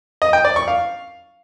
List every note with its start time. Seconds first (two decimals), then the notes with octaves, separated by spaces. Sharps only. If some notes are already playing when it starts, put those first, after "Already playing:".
0.22 D#5
0.33 G5
0.45 D5
0.56 C#6
0.68 F5